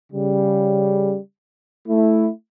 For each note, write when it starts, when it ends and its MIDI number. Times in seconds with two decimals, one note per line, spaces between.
0.13 1.18 49
0.13 1.18 55
1.88 2.29 57
1.88 2.29 64